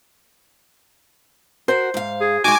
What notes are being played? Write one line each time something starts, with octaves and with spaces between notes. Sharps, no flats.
F#4 A#4 C5
G#2 F5
G#4
G#3 A3 D#4 F#4 G#5 D6